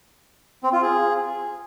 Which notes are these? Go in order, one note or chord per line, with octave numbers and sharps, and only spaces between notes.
C4
F4
G#4